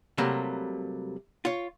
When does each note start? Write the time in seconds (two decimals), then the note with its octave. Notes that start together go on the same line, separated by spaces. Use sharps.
0.18 C3 F#3 G3 A3 A#3
1.45 F4 C#5